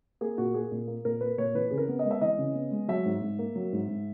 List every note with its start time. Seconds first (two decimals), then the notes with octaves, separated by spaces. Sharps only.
0.21 A#3 G#4
0.38 A#2 F#4
0.54 A#3 G#4
0.72 A#2
0.88 A#3
1.05 A#2 A#4
1.21 A#3 B4
1.38 A#2 C#5
1.55 E3 B4
1.71 C#3 G#4
1.78 A#4
1.89 B3
1.99 D#5
2.05 G#3
2.11 E5
2.21 E3 D#5
2.38 C#3
2.55 B3
2.71 G#3
2.88 F#3 E5
3.06 G#2
3.22 G#2
3.39 A#3
3.56 F#3
3.72 G#2
3.88 G#2